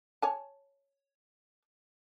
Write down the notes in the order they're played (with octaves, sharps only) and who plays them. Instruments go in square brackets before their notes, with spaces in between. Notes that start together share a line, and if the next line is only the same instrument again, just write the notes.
[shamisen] C#5 G#5 A5